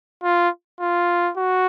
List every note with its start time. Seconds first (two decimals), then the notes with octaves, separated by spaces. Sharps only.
0.23 F4
0.80 F4
1.37 F#4